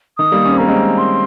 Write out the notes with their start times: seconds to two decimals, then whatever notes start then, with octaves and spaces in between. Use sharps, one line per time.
0.18 D#3 D#6
0.32 G3 A#3
0.45 C#4
0.53 C4
0.58 A#3 A#5
0.68 G#3 C4
0.98 C6